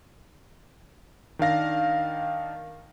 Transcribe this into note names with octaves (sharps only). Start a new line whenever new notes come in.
D#3 D4 F5 A#6